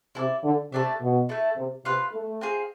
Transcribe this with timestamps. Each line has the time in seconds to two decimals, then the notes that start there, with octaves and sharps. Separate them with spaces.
0.15 C3 E4 A4 D5
0.44 D3
0.72 C3 A3 D4 A4 E5
1.01 B2
1.29 A3 E4 A4
1.57 C3
1.85 C3 F4 B4 F5
2.13 A3
2.41 C4 F4 G#4